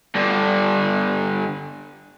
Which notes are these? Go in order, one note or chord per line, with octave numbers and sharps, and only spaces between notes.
G2 D3